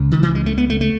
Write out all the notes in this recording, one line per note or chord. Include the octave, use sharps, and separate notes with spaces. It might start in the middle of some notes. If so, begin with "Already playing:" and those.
Already playing: C#2 C#3
D#3
E3
G#3
A3
B3
A3
A3